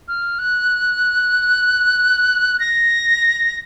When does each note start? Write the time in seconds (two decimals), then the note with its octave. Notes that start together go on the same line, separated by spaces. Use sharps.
0.08 F6
0.39 F#6
2.60 A#6